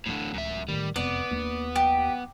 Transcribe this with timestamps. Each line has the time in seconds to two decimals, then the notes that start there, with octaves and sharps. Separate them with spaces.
0.06 D1 A1 A2 D3
0.34 C#2 F#2 E5
0.68 A2 D#3 E3 G3
0.96 E1 F2 C3 B3 D5
1.31 D#2 A#3 D4
1.76 F#3 G4